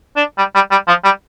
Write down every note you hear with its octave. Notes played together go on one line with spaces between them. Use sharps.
D4
G3
G3
G3
F3
G3